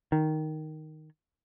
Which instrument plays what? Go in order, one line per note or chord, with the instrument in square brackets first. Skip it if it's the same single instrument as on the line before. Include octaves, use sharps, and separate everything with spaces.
[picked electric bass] D#3